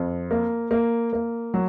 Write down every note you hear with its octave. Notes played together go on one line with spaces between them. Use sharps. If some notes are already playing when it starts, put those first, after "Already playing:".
Already playing: F2
A#3
A#3
A#3
F#3